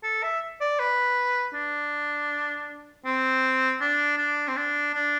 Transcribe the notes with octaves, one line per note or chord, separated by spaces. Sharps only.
A4
E5
D5
B4
D4
C4
D4
D4
C4
D4
D4